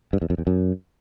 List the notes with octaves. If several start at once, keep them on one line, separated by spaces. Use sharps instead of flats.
G2
E2
F2
E2
F#2